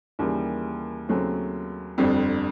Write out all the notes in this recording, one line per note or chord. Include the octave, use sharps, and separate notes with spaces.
D#2 C#3 E3 G3 A#3
D#2 C#3 F#3 A3 C4
G1 F2 D3 G3 C4